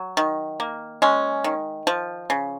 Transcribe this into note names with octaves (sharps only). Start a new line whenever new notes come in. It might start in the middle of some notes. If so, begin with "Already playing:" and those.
Already playing: F#3
D#3
A#3
G#3 C#4
D#3
F3
C#3